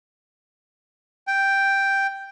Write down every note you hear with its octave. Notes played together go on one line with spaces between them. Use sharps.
G5